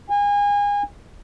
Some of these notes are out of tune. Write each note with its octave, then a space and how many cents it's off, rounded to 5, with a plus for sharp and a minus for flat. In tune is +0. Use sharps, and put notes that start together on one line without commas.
G#5 -30